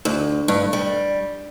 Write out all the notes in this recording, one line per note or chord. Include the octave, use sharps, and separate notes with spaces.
D2
G2
G3